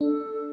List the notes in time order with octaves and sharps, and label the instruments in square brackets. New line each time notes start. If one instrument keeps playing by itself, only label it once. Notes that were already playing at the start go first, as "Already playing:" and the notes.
[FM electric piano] D4 [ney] A4